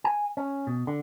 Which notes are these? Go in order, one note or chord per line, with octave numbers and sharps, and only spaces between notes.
G#5
C#4
B2
D3